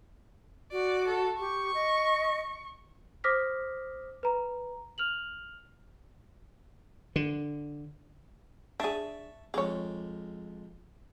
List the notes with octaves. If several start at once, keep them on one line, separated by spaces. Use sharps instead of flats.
F#4 D5
A4
G4 C#6
D#5
C5 D6 D#6 F6 A#6 B6
B4 A#5
F6 F7 F#7
D3
D4 G#4 E5 A5 C#6
F2 G#3 G#4 C#5 D6